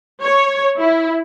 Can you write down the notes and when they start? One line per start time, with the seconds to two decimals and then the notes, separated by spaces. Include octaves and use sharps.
0.22 C#5
0.80 E4